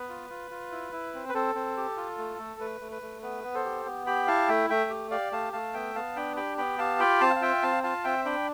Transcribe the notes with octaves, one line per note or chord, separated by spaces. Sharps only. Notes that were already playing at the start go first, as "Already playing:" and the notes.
Already playing: B3 B4
F4
F4
F4
E4
E4
C4
B4
C4 A4
C4
G4
F4
A3
A3
A3 B4
A3
B4
A3
B3 B4
B3
A4 C5
G4
B3
G4 G5 B5
E4 F5 A5
A3 E5 G5
A3 E5 G5
G4
G4 D5 F5
A3 F5 A5
A3 F5 A5
B3 E5 G5
B3 F5 A5
D4 G5 B5
G4 G5 B5
B3 G5 B5
G4 F5 A5
F4 G5 B5
C4 F5 A5
F5
F4 E5 G5
C4 F5 A5
F4 F5 A5
C4 E5 G5
D4 G5 B5